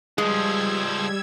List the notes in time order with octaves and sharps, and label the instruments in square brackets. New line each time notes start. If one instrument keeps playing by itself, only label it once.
[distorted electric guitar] C#2 F3 [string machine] G3 E6 G#6 [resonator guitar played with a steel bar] G#3